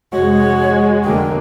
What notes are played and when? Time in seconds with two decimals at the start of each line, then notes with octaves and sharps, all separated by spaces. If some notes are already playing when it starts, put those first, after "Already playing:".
0.13 F1 G#3 F#4 C#5
1.04 F1 D3 A#3 G5